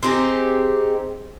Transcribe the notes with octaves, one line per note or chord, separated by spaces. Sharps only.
C4 D#4 G4 G#4